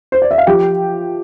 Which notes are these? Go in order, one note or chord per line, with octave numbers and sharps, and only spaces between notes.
C5
D5
E5
F5
F3 G4 G5